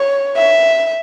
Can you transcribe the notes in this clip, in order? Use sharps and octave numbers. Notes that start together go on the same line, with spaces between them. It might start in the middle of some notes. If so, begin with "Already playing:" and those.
Already playing: C#5
E5